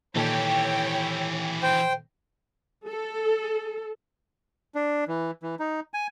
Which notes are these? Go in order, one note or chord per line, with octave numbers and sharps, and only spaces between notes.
A#2 D#3 E3 G4 A4 C#5 G5
C5 G5
A4
D4
E3
E3
D#4
G#5